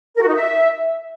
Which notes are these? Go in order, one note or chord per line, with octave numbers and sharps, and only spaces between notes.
A#4
F#4
D#4
E5